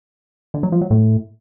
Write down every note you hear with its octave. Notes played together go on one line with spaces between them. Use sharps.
D3
F#3
F3
F#3
A2